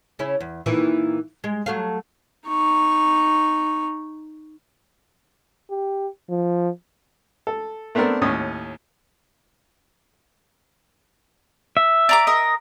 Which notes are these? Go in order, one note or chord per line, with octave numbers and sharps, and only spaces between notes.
C#3 C#4 E4
E2
A#2 D#3 E3
G#3
F#3 A3 F5
D#4 C#6
G4
F3
A4
A3 B3 C4 D4 A#4
D#2 A2 C#4 D#6
E5
D5 A#5 D6
A#4 D#5